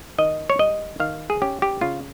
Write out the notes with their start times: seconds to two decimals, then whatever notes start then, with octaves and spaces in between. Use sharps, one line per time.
0.18 D#3 D#5
0.50 C#5
0.59 G3 D#5
1.00 D#3 F5
1.30 G#4
1.42 C#4 G4
1.62 G4
1.81 C#3 F4